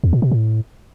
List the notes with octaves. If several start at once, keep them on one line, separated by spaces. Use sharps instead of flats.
E2
A#2
B2
A2